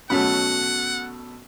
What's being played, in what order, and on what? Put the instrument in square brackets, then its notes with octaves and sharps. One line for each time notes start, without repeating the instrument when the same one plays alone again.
[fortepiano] B2 F#3 A3 [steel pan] C#4 B5 [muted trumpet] F#5